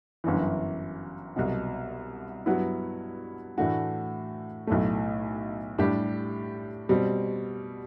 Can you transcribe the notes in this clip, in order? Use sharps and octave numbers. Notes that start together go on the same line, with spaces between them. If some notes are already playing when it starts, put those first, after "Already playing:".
G1 F#2 E3
C2 B2 F#3
G2 F#3 B3 E4
A2 E3 A3 D4 F#4
B1 A2 F#3 A3
A2 G3 D4 G4
B2 G3 C4